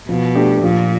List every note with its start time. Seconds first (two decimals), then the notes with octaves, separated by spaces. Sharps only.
0.08 B2 F3
0.35 A3 D4 G4
0.63 A#2 F3